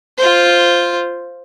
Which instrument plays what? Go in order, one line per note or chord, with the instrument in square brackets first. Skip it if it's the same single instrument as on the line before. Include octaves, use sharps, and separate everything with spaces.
[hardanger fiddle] F4 C5